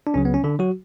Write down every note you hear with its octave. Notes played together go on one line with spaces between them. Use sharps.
D4
C#2 C#3 F#3 C#4
B3
C#4
D3 D4
F#3 F#4